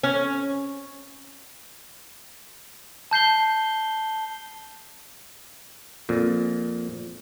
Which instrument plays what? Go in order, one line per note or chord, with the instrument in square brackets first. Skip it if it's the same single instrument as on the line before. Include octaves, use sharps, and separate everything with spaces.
[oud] C#4
[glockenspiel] A5 G6 C7 G7
[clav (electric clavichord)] F2 A#2